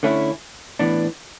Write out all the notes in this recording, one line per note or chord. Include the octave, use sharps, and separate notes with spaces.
D3 A3 C#4 E4
A2 E3 B3 D4